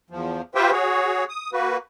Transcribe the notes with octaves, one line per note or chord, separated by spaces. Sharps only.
E2 F3
F4 G4 B4 C5 E5 G5
F#4 G#4 C#5
D#6
A#3 F#4 B4